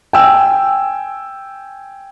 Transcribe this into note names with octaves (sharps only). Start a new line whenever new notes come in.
G5 G#5 E6